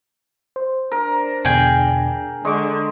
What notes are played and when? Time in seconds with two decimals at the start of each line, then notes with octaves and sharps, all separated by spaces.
0.56 C5
0.92 D4 A#4
1.45 E2 B2 D3 G#4 G5
2.45 D3 G#3 D5 C#6 D6